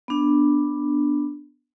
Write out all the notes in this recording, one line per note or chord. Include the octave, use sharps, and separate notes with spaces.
B3 D4